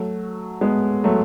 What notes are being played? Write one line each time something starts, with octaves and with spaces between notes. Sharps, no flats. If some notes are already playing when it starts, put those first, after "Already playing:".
Already playing: F#3 A3
G#3 B3
F#3 A3